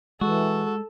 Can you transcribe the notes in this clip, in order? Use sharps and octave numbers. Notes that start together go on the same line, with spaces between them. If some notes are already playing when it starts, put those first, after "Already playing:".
E3 G#3 F#4 A4